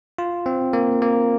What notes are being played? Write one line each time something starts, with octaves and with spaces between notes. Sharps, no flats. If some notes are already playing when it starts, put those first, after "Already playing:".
F4
C4
A#3
A#3